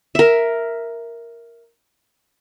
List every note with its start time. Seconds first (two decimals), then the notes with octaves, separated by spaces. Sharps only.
0.15 A#4 E5